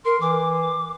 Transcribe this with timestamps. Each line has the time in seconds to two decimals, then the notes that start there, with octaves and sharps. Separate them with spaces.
0.05 A#4 C6
0.21 E3 D6